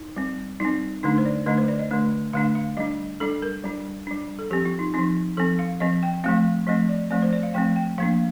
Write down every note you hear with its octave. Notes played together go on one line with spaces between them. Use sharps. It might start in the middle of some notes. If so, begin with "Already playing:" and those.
Already playing: D#4
G3 C4
G3 C4 D#4
D3 A3 D4 D#4
C5
D5
D3 A3 D4 D#5
C5
D5
D#5
D3 A3 D4
D3 A3 D4 F5
F5
G3 D4 D#5
G3 D4 A4
A#4
G3 D4
G3 D4
A4
F3 C4 G4
F4
D#4
F3 C4 D#4
F3 C4 A4
F5
F3 C4 D#5
G5
F3 A3 C4 F5
F3 A3 C4 D#5
D5
F3 A3 C4 D5
C5
D5
F5
F3 A3 C4 G5
G5
F3 A#3 D4 F5